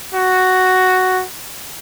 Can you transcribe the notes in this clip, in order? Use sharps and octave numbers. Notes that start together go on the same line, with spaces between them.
F#4